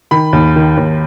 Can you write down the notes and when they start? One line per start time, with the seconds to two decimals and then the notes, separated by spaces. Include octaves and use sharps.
0.11 D#3 B5
0.33 D#2
0.56 D#3
0.77 D#2